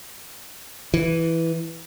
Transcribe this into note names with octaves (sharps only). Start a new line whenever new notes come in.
E3